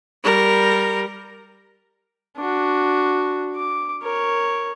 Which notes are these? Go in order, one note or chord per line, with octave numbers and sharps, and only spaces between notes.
G3 A#4
D4 F#4
D6
A#4 C#5